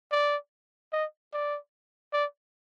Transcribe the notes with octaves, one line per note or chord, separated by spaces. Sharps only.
D5
D#5
D5
D5